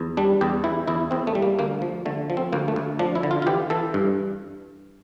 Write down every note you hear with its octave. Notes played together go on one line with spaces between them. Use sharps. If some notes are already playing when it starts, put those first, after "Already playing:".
Already playing: E2
G3 D4
E2 G4
E3 E4
E2 E4
E2 C4
A3
G3
A#3
D2 A#3
F3
D3 A3
F3
C4
D2 A#3
A3
D2
F3 D4
E4
D3
F4
F4
E3 G4
E3 A4
G2